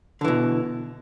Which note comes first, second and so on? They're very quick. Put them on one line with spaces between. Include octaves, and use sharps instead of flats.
D3 E3 B2